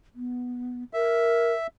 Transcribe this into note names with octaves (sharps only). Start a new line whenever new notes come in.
B3
A#4 E5